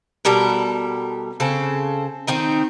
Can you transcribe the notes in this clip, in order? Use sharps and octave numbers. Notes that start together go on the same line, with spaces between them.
B2 G3 A4 A#4
C#3 C4 A4
D#3 C4 D#4